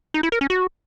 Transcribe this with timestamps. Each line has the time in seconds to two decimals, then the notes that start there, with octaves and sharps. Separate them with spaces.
0.14 D#4
0.23 E4
0.32 A#4
0.41 C#4
0.50 F#4